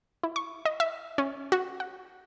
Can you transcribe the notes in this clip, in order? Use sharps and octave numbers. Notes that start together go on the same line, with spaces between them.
E4
C#6
D#5
E5
C#4
F#4
F#5